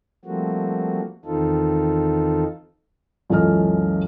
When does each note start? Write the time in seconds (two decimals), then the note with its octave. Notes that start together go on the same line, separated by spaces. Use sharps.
0.25 F3 G3 A3 A#3 C4 F#4
1.25 E2 D#3 C4 D#4 F4 A4
3.30 C#2 F#2 E3 A4 D#5 F6